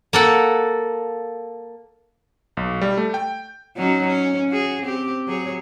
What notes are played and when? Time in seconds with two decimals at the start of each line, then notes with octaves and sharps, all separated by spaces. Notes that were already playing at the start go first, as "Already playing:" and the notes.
0.13 A#3 A4 F#5
2.57 B1
2.81 G3
2.97 A3
3.14 G5
3.76 F#3 C#4 D#4
4.07 C#4
4.49 F#4 G#4
4.82 C4 G4
5.27 F#3 G#4 C#5